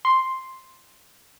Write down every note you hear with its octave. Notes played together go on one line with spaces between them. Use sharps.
C6